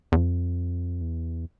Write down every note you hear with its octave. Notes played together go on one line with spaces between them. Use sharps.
E2
F2
E2